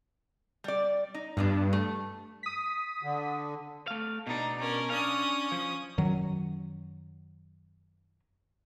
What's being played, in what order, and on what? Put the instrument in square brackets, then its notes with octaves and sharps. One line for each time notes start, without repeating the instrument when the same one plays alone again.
[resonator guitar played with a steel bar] G3 D5
D#4
[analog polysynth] G2 [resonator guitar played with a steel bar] F3 B3 D4
[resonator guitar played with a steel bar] A3
[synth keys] D#6 B6
[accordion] D3
[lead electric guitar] A3 F5
[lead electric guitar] B2 D4 [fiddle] D#4
[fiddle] C#4 A#4
[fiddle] C#4 D#6 [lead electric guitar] D4 F5
[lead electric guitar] F3
[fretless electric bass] F#2 D#3 F#3